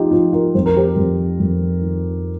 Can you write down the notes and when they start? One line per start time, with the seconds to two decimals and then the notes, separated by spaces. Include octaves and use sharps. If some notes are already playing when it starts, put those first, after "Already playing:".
Already playing: F3 D#4 F4 G4
0.11 F3 F4
0.33 F4 A#4
0.55 F2 C5
0.66 A#4
0.76 G4 C5
0.97 F2
1.40 F2
1.81 D#3